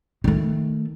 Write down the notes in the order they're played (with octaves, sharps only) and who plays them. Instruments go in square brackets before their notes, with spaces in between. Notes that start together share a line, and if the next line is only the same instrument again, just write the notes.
[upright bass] D#3 A3